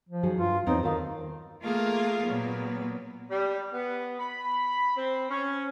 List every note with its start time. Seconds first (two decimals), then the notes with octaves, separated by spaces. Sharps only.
0.09 F3
0.23 D#3 F#3 G#4
0.37 G2 F4
0.66 E2 C4 D#4 C#5
0.83 D#3 A4 F5
1.63 A3 A#3 F4 G#4 A#4 F5
2.25 A#2 F#3 B3
3.30 G3
3.72 B3
4.19 B5
4.95 C4
5.29 C#4